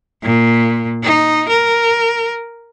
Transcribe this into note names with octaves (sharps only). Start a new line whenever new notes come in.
A#2
D#4
A#4